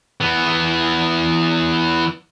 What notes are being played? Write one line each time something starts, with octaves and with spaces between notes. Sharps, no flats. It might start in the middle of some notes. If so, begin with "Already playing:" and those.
E3 B3